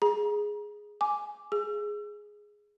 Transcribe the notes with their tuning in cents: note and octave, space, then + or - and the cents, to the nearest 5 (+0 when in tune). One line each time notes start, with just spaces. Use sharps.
G#4 +0 A#5 +35
G#5 +5 D6 +0
G#4 +0 E6 +35